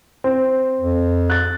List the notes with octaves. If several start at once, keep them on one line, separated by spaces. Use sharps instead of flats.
C4
F2
F#6 A6